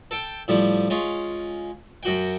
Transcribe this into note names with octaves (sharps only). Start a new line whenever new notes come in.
A4 G5
A2 F3 G3
G#3 C#4 F4
F#2 F#4 G5